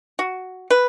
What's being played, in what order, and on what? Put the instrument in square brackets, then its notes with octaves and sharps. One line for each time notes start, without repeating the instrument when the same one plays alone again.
[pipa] F#4
B4